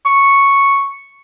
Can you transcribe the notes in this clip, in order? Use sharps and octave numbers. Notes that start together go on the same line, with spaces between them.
C#6